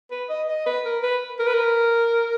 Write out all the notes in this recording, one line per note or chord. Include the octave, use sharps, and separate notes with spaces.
B4
D#5
D#5
B4
A#4
B4
A#4
B4
A#4